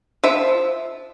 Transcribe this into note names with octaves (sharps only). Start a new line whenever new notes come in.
F3 E5